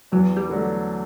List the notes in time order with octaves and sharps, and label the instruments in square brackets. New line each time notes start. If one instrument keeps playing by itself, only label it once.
[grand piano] E2 [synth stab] F#3
[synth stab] G3
[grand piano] D3 F#3 A3